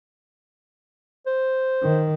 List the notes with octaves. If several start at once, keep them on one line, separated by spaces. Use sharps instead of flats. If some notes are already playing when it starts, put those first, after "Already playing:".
C5
D#3